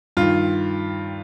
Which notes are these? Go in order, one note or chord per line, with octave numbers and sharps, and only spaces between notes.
G2 D#3 F4